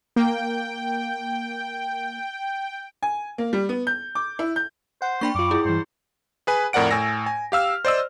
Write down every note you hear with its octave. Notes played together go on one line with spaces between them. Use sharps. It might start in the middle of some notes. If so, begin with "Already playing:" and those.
A#3 G5
G#5
A#3
G3
B3
G6
D6
E4
G6
C5 F#5
A#3 D4 G5 B5 C#6
F#2 F4 D6
E4 G#4
G2 E3 C5
G#4 B4 G#5
F2 A2 A#4 D5 F#5 D7
A2 G#5 E6 A#6
G#5
G4 F5 E6 F6
C5 D5 D#5 E6